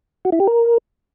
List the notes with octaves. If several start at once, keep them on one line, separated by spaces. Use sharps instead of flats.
F#4
E4
G4
A#4